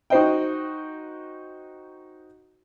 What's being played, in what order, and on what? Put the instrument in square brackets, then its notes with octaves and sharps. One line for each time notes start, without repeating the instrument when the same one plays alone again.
[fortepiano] D#4 F#4 C5 D#5 G5